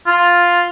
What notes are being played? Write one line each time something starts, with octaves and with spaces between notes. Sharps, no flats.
F4